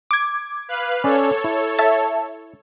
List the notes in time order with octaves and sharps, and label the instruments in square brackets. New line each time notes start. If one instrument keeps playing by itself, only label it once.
[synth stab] D6 G#6
[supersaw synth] B4 F5 F#6
[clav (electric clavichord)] C#4 D5 [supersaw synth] A4 C#5
[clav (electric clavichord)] E4
[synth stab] E5 A5